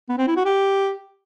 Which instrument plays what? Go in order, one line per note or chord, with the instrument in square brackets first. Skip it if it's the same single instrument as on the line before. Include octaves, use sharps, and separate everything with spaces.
[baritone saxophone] B3
C4
E4
F#4
G4